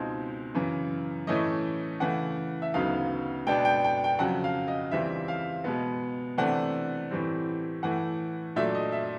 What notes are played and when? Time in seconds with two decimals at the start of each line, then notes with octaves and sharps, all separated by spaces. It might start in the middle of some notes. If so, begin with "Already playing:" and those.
Already playing: C#2 B2 G#3 C4 D#4
0.55 F#2 C#3 E3
1.27 A2 E3 A3 C#4 D#5
2.00 C#3 E3 A3 F#5
2.62 E5
2.74 D2 C#3 F#3 B3 D#4 F5
3.46 B2 G#3 B3 D4 G5
3.65 G5
3.84 G5
4.04 G5
4.19 F2 C#3 F#3 F#5
4.44 F5
4.68 D#5
4.91 C#2 C#3 E3 G3 C4 E5
5.28 F5
5.64 B2 G#3 B3
6.38 C3 E3 A3 D4 F#5
7.11 A2 E3 G3 C4
7.83 A2 E3 A3 F#5
8.56 A#2 F#3 A3 D4 E5
8.74 D#5
8.92 E5